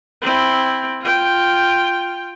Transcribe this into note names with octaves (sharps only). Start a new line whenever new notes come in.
C4 E4
F4 G5